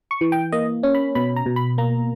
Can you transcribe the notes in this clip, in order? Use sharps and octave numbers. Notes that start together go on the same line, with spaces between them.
C#6
E3
G5
A#3 D#5
C#4
B5
B2 B5
A#5
B2
B5
A#3 A#5